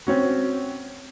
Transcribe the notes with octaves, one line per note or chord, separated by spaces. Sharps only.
C4 C#4 F#4